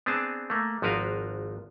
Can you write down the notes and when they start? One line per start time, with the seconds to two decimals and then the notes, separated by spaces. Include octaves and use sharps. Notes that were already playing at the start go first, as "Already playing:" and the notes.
0.06 B3 C4 D4 G#4 A5
0.50 A3 A#3
0.82 G#1 F3 F#4 A#4 B4 F5